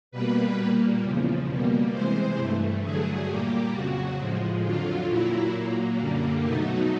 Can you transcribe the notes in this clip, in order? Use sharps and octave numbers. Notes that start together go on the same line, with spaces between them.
B2 G3 A#3 B4
A#2 G3 A#3
E2 C#3 F3
B2 G3 A#3
C3 E3 G#3 C5
G2 E3 A3
G2 D3 F#3 A3 G#4
A#2 G3 A#3 G4
F2 C#3 F#3 F#4
A2 F3 G#3
F2 D3 F#3 F4
A#2 F#3 A#3 E4
A#2 F#3 A#3
F#2 D3 G3 A#3
B2 F#3 A3 D#4